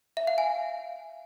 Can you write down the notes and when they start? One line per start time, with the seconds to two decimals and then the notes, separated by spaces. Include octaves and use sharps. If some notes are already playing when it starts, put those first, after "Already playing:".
0.17 E5
0.27 F5
0.38 G#5